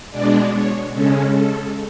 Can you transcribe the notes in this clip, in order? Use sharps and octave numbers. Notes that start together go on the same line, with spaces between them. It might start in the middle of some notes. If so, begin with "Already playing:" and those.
B2 G#3 D4 D5
C#5
C#3 G#3 C#4 A4
A4